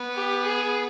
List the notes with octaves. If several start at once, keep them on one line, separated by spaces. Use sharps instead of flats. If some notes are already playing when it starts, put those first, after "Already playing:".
Already playing: B3
G4
G#4